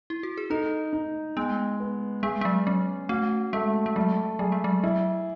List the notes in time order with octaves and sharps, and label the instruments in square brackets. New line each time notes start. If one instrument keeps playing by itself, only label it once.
[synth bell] E4
F#4
G#4
[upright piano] D#4 [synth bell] A4
[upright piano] D#4
[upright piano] G#3 [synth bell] B3
[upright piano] B3
[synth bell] G#3 [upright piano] G#4
[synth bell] G#3
F#3
[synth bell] F#3 [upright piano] C#4
[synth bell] A3 [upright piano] F#4
[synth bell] G#3 [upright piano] A3
[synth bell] G#3
[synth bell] F#3 [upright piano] A3
[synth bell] F#3 [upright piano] G#4
[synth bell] G#3
F#3
[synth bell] F#3 [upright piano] E4